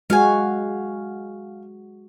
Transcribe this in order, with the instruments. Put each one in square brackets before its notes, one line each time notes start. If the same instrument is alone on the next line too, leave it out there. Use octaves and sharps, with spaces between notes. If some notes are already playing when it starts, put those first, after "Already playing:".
[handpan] G#3 F#4 [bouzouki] F5 G#5